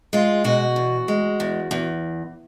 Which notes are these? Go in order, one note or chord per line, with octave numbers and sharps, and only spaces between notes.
G#3 F4
B2 F#4
E2
G#3
E2
E2